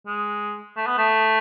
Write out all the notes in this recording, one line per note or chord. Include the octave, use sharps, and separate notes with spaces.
G#3
A3
B3
A3